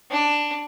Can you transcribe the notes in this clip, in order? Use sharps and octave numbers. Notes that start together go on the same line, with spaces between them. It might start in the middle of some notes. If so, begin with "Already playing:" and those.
D4